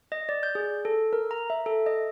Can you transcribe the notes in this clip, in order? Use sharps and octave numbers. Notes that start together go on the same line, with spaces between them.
D#5
D5
G6
G#4
A4
A#4
A#5
E5
A4
D#5